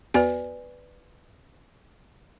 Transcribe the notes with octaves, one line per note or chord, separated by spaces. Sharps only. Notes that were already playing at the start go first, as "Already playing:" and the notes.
E2 B3 F#4 B4 D5 G#5